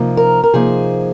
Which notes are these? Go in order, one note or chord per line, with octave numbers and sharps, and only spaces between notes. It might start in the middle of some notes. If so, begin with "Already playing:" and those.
Already playing: C3 F3 A#3 D#4
A#4
A#4
C3 F3 A#3 D#4 G#4